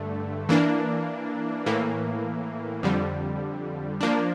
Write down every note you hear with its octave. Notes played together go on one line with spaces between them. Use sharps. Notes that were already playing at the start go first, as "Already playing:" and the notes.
Already playing: G2 D3 A3
E3 A#3 D4
A2 E3 A#3
F2 D3 G3
F3 A#3 D4